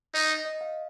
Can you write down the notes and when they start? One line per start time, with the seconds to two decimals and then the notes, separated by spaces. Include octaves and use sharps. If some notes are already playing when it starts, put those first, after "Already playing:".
0.14 D#4 D#5
0.30 D#5
0.45 D#5
0.61 F5